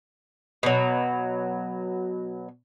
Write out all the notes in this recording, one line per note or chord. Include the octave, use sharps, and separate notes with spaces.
B2 F#3